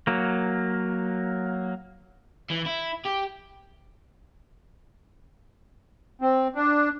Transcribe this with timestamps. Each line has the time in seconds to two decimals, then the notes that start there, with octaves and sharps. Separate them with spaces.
0.07 F#3 A#3
2.50 E3
2.67 E4
3.06 G4
6.21 C4
6.55 D4